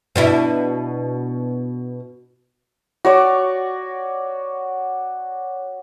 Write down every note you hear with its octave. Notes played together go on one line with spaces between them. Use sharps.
B2 D4 E4
F#4 C#5 D5